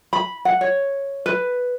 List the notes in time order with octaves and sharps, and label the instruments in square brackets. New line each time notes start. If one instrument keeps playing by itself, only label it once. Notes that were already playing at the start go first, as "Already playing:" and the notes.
[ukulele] B5
F#5
C#5
B4